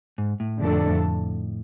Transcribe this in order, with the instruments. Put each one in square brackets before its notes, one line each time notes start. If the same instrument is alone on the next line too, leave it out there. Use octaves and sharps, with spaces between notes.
[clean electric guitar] G#2
A2
[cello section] F2 D3 A3 D4 A4